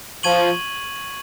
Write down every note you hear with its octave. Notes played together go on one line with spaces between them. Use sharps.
F3 C#6 G#6 D#7 F#7